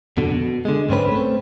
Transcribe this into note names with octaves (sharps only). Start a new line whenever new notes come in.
F2 B2 D3
B2
D3 G#3
B1 G#2 D3 C4 C#4 B4
A3 C4